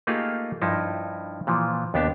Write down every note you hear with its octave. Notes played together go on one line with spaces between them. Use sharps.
A3 A#3 D#4 F4 G4 G#4
G2 F3 D#4 E4
A#2 E3 F3
D#2 B3 D4 G4 A5